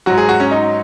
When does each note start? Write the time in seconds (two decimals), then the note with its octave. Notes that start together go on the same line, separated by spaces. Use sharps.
0.06 G#2 F#3 F#4
0.18 G#4
0.29 F#4
0.40 C#4
0.51 D#4